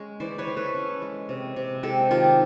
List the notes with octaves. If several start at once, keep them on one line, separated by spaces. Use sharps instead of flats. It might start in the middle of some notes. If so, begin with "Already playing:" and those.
Already playing: G#3 C#4
E3 C5 D5
B4 C#5
E3
A4 B4
C#4
G#3
C3
C3
G#3 G4 A4
D#3 F4 G4